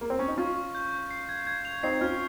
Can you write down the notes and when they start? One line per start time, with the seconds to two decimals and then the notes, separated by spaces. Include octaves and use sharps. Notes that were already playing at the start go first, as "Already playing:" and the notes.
0.01 A#3
0.10 C4
0.19 C#4
0.28 D#4
0.38 C#4 F4 C#6
0.56 C#6
0.75 G6
0.92 C#6
1.11 C7
1.29 G#6
1.47 G#6
1.65 F7
1.83 C4 D#4 C7
2.01 C#4 F4 F6